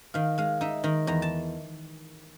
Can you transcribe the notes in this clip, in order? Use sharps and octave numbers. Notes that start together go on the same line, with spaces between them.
D#3 F5
G#3 F5
D#4 E5
D#3 A#5
E2 A#5
A5